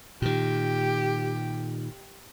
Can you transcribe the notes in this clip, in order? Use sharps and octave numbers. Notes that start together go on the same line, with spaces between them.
A#2 D#3 G4